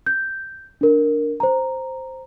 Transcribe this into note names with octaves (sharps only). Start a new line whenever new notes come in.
G6
D4 A#4
C5 A#5